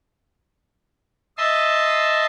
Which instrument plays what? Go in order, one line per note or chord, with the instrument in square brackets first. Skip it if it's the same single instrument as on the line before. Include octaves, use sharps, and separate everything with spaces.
[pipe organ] D#5 E5 A5 C6